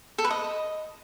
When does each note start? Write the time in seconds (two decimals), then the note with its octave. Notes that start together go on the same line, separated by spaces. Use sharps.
0.18 A4
0.25 B4
0.31 D#5